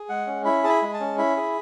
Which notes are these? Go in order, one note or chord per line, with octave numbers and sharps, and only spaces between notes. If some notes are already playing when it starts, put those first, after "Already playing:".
Already playing: G#4
G#3 F#5
C#4
E4 B5
G#4 A5
B5
G#3
A5
C#4
E4 B5
G#4